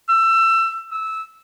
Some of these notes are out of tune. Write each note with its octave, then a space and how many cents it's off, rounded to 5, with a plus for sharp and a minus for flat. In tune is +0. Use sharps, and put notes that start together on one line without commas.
E6 +25
E6 -15